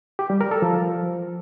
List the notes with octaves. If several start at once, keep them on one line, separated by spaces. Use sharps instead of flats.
G4
G3
A#4
A4
F3